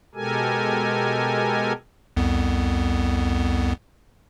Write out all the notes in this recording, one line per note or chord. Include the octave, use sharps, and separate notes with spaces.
B2 G#3 G4 A4 A#4 G#5
C2 F2 B3